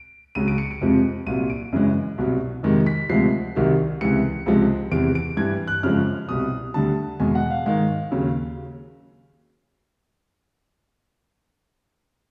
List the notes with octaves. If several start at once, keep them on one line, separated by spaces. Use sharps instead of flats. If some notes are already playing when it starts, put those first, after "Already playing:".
Already playing: D7
C#2 C#3 F#3 D#7
D7
C#7
D7
F2 C3 F3 G#3
C2 A#2 F#3 D#7
D7
F#2 C#3 E3 G#3
C2 B2 F#3
F2 C3 D#3 G#3
B6
D2 C3 F3 G#3 C7
C2 C3 D#3 F#3
C#2 C3 E3 C#7
C#2 C3 F3 G#3
E2 C3 E3 D7
D7
G2 E3 G3 G#6
F#6
F#2 C#3 F3 G#3 F6
C2 B2 G3 D#6
D2 D3 G3 A5
E2 B2 G#3 G#5
F#5
F5
G#2 D#3 G#3 F5
D#2 C#3 F#3